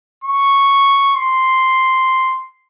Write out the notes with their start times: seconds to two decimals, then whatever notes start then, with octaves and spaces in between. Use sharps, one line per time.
0.24 C#6
1.16 C6